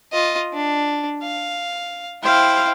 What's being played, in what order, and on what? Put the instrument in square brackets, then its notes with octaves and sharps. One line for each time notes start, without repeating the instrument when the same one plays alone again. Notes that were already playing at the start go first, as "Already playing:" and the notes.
[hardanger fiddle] F4 D#5
D4
F5
[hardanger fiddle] E4 G5 [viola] C5 F5